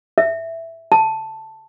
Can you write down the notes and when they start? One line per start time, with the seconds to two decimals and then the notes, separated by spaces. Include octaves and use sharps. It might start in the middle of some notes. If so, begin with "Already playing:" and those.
0.18 E5
0.92 A5